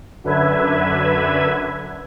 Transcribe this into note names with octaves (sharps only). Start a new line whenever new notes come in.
F#2 D3 B4 E5 G#6